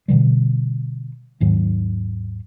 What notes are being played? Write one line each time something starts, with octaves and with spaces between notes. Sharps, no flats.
B2 D3 E3 G3
D#2 G#2 D#3 F#3